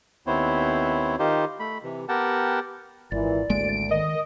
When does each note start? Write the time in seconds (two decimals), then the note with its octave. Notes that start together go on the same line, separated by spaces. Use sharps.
0.27 D#2 B3 C4 E4 C5 C#5
1.19 D#3 D#4 F4 G4 C5
1.60 A3 B5
1.83 C3 E3
2.09 B3 G4 A#4 F#5 G5 A5
3.12 G#1 A#2 E3 D5
3.50 G#1 D2 G#3 A#3 D7
3.91 D#3 D#5